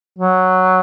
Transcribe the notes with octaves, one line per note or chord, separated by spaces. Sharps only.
F#3